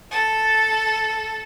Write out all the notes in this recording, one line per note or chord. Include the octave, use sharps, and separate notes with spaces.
A4 A5